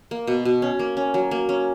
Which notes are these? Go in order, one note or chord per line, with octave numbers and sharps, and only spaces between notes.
A#3
B2
B2
C#4
A#3
C#4
F#3
A#3
C#4